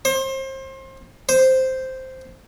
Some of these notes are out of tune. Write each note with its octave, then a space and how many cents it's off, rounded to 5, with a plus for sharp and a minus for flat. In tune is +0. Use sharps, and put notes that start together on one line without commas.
C5 +30
C5 -5